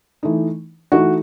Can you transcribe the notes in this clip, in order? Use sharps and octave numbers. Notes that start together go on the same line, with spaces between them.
E3 A3 D#4
E3 A3 D#4 F#4